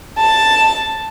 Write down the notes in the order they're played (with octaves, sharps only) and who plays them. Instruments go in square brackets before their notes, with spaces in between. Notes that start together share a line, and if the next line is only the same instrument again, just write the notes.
[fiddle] A5